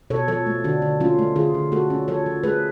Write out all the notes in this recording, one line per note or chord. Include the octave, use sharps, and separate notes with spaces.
B2 A4 C#5
F3 A4 C#5
A3
D3 D4 F#4
D3
F3 C#4 F4
A3
D3 F4 G#4
D3
A3 F#4 A4
C#4
F3 A4 C#5
F3
A3 G#4 B4